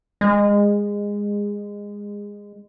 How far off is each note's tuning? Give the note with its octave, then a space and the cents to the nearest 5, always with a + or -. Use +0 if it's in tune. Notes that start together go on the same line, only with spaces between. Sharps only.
G#3 -20